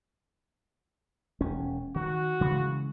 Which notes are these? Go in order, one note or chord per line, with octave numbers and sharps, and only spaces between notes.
E1 C#4
D#3 F#4
C#3 E3 G#3